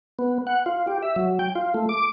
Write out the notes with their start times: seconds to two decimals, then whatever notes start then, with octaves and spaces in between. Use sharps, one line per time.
0.19 B3
0.47 F#5
0.66 F4
0.87 G4
1.03 E5
1.16 F#3
1.39 G5
1.55 F4
1.74 A3
1.89 D6